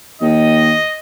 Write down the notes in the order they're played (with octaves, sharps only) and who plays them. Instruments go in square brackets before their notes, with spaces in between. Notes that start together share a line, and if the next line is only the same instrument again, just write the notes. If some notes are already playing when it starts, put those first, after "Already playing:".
[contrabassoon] D#2 [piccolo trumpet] D#5